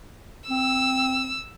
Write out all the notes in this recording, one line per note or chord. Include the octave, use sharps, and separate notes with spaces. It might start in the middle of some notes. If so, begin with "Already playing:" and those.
C4 E6